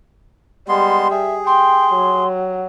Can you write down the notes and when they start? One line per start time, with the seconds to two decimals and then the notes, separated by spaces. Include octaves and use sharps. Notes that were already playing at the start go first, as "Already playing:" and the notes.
0.69 G3 G#3 B3 C6
1.11 G#4 E5
1.46 G5 C6
1.94 F#3